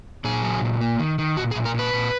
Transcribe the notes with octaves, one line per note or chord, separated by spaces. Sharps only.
A#2 G#4
F#3
A#2
A#3
D#3
D#3
A#2 F#4
G#4
A#2
A#4
A#2 B4
A#2